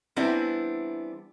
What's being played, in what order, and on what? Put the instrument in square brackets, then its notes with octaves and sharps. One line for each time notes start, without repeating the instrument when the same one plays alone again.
[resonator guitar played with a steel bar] E3 G3 B3 C4 D4 E4